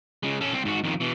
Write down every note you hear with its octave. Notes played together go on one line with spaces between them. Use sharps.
C#3 G#3
C#4 A4
C2 C4
G#2 F#4
F2 D#3
B2 E3